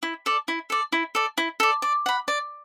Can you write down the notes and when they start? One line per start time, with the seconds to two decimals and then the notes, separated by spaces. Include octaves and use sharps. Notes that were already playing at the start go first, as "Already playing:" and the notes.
0.03 E4
0.26 A4 D5
0.48 E4
0.70 A4 D5
0.92 E4
1.15 A4 D5
1.38 E4
1.60 A4 D5
1.82 D5
2.06 F#5 B5
2.28 D5